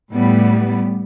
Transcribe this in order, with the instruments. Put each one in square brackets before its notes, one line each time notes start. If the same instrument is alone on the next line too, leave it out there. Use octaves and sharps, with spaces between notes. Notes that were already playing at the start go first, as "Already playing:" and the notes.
[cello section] A2 G3 B3